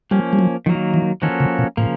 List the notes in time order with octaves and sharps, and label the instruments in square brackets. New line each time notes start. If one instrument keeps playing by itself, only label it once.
[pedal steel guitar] F3 A#3 C#4 [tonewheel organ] G3
[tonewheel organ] G3
F#3
[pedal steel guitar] D#3 F#3 A#3 [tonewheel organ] F3
[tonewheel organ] E3
[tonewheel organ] D#3 [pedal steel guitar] F3 A#3 C#4 F#4 A4
[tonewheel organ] C#3
B2
[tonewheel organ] A2 [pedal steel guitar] C#3 F3 A#3